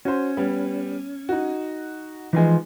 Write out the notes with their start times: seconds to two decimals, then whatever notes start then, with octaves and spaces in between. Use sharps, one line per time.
0.05 C#4 F#4 C5
0.37 G3 B3
1.29 D#4 F#4
2.33 E3 F3 G#3 D#4 G#5